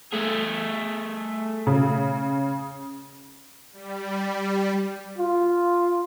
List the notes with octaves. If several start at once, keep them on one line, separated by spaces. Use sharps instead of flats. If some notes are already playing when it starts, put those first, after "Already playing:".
A3 G#4
C#3
G3
F4